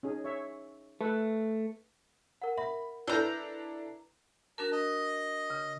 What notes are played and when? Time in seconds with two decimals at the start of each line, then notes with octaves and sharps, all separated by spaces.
0.03 C#4 D#4 G#4
0.24 C#5 E5
1.01 A3 B4 E5
2.42 A#4 F#5
2.57 E5 B5
3.08 D4 E4 A4 B4 G#5 A#5 E6 G6
4.58 D4 F#4 A#4 A5 A#5
4.72 D#5
5.50 C#3